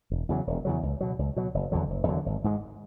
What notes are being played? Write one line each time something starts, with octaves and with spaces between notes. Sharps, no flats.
E1
E2 C#3 F#3
E1
E2 C#3 F#3
C#2
B2 F#3
C#2
B2 F#3
F#1
E2 D3 F#3
F#1
E2 D3 F#3
G#1
G#2 G#3